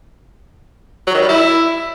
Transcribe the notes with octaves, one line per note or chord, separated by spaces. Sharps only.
F#3
D#3
G3
E4